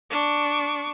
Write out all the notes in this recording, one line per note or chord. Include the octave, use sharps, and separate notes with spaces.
D4 C#6